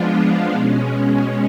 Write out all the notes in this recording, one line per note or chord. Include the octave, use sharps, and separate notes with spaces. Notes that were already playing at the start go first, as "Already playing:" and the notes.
Already playing: F3 G#3 B3 D4 F4
B2 G#3 C#4